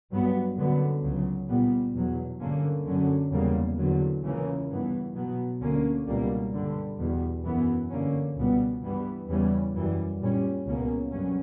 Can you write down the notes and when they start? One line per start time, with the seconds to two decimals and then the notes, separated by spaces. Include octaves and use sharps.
0.11 G2 F#3 B3
0.56 F#2 D3 F#3 B3
1.02 C#2 C#3 F#3
1.47 A#2 G3 B3
1.94 E2 B2 F#3
2.40 G2 D3 A#3 C#4
2.85 F#2 D3 F#3 C#4
3.31 E2 C#3 G3 A#3
3.78 E2 D3 F#3
4.23 C#2 C#3 E3 A#3 C#4
4.69 G2 E3 B3
5.15 B2 F#3 B3
5.61 D2 D3 A#3 C#4
6.07 C#2 B2 G3 A#3
6.53 G2 D3 G3
6.99 E2 B2 G3
7.44 F#2 E3 B3
7.90 G2 D3 A#3 C#4
8.36 C#2 B2 G3 B3
8.82 G2 E3 G3 B3
9.28 E2 C#3 E3 G3 C#4
9.74 F#2 E3 G3
10.19 A#2 G3 C#4
10.65 C#2 B2 A#3 C#4
11.11 G2 F#3 C#4